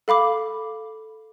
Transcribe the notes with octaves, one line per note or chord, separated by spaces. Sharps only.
A4 F5 B5 D6